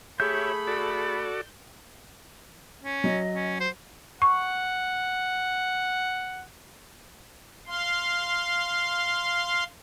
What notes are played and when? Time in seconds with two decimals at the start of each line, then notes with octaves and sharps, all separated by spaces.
0.20 A3 G4 G#4 C#5 E5 B5 G6
0.67 F#4 A4 D5
2.82 C#4
3.04 F#3 D#5
3.34 C#4
3.61 C5
4.22 F#5 C#6
7.67 F5 C6